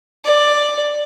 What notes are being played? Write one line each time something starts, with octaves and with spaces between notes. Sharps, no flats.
D5